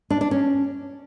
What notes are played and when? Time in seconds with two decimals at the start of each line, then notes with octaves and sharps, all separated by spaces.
0.10 D4
0.21 D4
0.31 C#4